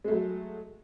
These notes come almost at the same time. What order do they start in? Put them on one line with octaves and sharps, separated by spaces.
G#3 A3 F#3